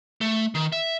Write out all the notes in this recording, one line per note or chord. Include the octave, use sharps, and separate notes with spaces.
A3
D#3
E5